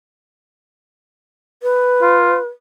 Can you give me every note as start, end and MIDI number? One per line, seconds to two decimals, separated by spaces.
1.63 2.46 71
2.02 2.36 65